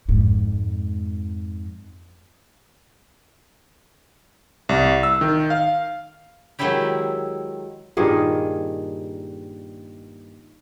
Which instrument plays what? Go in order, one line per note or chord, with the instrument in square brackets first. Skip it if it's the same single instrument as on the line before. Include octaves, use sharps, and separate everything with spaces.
[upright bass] F2 G#2
[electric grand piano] C2
E6
D#3
F5
[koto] D#3 F#3 G#3 D#4 E4 G4
[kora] G2 A#2 D#3 G#4